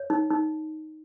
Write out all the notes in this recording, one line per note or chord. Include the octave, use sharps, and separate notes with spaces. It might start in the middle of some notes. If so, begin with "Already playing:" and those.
Already playing: C#5
D#4
D#4